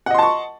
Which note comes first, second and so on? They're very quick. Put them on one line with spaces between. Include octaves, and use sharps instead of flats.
F#5 D#5 C6 A5 C#6